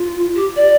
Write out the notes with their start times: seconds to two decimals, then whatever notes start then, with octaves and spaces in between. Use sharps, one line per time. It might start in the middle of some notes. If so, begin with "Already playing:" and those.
Already playing: F4
0.35 G4
0.56 D5